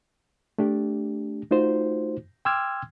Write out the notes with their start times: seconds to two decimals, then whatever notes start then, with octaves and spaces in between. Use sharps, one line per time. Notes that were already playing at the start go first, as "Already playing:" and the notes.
0.58 A3 D4 G4
1.51 A3 D#4 F4 F#4 C5
2.45 G5 C6 D6 E6 F6 G#6